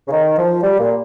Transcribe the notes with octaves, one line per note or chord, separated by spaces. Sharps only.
C#3
D#3
F3
G3
A#2